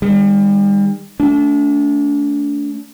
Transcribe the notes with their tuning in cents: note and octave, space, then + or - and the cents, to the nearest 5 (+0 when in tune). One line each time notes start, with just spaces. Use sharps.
D#3 -10 G3 +40
A3 -5 D4 -35